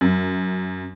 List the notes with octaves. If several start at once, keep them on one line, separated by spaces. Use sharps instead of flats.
F#2